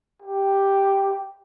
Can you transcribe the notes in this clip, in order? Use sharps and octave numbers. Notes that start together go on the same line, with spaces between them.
G4